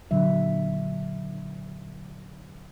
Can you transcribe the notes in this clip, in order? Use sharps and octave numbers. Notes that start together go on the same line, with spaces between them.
A#2 D3 F#3 E5